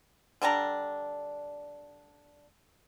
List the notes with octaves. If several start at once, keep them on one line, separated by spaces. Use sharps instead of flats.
D3 G3 D4 A#5